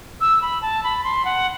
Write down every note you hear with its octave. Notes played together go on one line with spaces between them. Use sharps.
E6
B5
A5
B5
C6
F#5